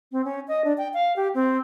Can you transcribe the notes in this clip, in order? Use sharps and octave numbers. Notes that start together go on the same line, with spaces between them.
C4
C#4
D#5
D4
G5
F5
G4
C4